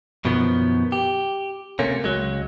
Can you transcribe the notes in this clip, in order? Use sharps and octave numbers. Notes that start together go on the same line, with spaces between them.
F#2 B2 D#3 F3 B3
G4
C3 A3 A#3 C#4
C#2 F#3 G#3